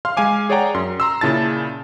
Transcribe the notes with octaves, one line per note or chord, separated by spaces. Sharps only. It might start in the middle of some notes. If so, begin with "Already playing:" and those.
F5 C6 F6
G#3 F5 G#5 D6
G#4 C#5 D5 F#5 G5 A#5
F#2 C6
A#5 C6 E6
A#2 C#3 E4 A5 A6